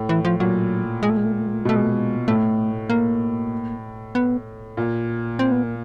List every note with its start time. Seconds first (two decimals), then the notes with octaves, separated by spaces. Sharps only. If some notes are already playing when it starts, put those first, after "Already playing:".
Already playing: A2
0.09 E3
0.25 F3
0.40 A#2 F#3
1.03 G#3
1.10 A3
1.17 G#3
1.25 A3
1.32 G#3
1.40 A3
1.46 G#3
1.54 A3
1.61 G#3
1.65 B2 A3
1.76 G#3
1.84 A3
1.91 G#3
2.28 A2 A3
2.90 A#3
4.15 B3
4.77 A#2
5.39 C4
5.52 B3
5.63 A#3